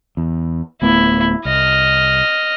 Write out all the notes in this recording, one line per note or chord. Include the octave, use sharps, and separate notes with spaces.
E2
D1 A3 B3 E4
C2 D#5 F6